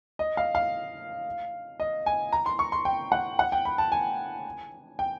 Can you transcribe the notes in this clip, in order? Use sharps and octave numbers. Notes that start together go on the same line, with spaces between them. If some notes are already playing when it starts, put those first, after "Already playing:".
D#5
F5
F5
D#5
G#5
A#5
C6
C#6
C6
G5
F#5
F#5
G5
B5
A5
G#5
G5